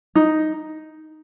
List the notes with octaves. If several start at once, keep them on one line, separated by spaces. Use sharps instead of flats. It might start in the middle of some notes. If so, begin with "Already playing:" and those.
D#4